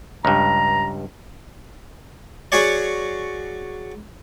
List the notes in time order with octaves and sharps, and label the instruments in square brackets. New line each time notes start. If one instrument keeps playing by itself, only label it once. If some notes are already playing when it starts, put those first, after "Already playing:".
[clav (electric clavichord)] C#2 G2 [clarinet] A#5
[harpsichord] F#3 F#4 G#4 C#5 D5